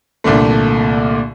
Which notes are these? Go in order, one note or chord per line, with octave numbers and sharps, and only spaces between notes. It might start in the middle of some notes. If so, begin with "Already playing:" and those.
C2 A#2 D3 A3